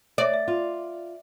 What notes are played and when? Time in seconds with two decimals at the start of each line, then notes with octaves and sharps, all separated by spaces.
0.18 C#5 D5 E5
0.34 E5
0.48 F4